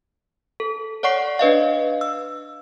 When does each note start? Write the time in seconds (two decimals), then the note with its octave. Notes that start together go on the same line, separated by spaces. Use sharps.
0.60 A4
1.03 C#5 D5 F#5 C#6 C7
1.39 D4 B4 D#5 F5
2.01 E6